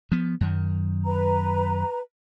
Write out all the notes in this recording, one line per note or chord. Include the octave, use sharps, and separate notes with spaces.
F3 B3
F#2 D#3
B4 A#5